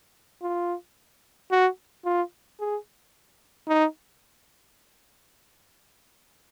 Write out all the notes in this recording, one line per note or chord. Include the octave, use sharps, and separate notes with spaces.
F4
F#4
F4
G#4
D#4